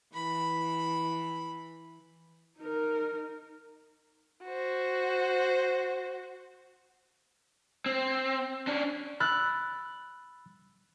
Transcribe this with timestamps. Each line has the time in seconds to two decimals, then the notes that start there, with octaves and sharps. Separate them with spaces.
0.14 E3 B5
2.59 D#4 A#4
4.44 F#4 C5
7.86 C4
8.67 C#4 D4
9.20 B5 E6 F#6 A6